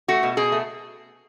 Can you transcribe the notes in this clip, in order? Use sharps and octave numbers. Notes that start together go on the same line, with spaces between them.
A3 F#4
B2
B2 G#4
A3